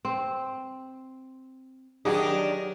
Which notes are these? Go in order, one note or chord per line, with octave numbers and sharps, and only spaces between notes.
C4
D#3 F#3 D4 D#4 G4 G#4